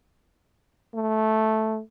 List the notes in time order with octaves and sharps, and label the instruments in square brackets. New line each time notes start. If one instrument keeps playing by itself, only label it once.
[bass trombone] A3